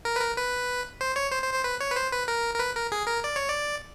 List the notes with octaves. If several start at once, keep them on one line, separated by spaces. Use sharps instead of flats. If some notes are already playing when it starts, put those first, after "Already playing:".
A#4
B4
A#4
B4
C5
C#5
C5
C5
C5
B4
C#5
B4
C5
B4
A#4
A#4
B4
A#4
G#4
A#4
D5
C#5
D5